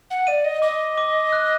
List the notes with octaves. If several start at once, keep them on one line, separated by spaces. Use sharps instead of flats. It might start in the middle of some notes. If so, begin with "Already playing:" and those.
F#5
D5 D#7
D#5
D#5 D6
D6
F#6